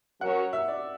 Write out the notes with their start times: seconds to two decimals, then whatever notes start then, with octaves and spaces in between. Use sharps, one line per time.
0.21 F#3 C#4 F#4 A#4 C#5 F#5
0.53 E5
0.68 D5